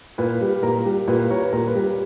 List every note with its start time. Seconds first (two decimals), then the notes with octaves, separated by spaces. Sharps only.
0.18 A#2 B4
0.41 G3
0.62 A#2 A#4
0.85 G3
1.08 A#2 B4
1.30 G3 A#4 C#5
1.44 B4
1.53 A#2 A#4
1.67 B4
1.75 G3